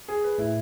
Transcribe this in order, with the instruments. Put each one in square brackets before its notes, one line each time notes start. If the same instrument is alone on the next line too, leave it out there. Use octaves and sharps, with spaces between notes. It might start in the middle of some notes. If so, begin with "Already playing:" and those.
[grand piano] G#4
B4
[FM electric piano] A2 [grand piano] E4